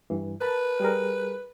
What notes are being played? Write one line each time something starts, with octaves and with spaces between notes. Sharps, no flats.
G2 E3
A#4 B4 A5 B5
G3 G#4 A#4